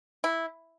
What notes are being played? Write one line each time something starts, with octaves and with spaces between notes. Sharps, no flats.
E4